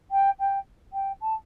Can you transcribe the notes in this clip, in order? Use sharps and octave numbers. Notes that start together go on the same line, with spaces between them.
G5
G5
G5
A5